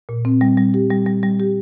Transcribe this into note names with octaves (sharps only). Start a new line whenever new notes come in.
A#2
C4
G3
G3
G4
G3
G3
G3
G4